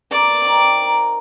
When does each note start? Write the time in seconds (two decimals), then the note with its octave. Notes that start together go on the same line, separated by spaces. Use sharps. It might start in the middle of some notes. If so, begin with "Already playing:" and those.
0.11 A#4 D5 D6
0.41 C4 D#4
0.82 A#4